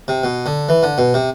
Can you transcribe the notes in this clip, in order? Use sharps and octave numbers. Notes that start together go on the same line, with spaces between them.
C3
B2
D3
E3
D3
B2
C3